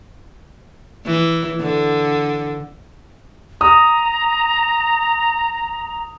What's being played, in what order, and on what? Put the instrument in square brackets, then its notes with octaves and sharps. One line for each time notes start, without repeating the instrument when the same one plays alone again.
[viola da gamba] E3
D3
[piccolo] A#5 [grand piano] D#6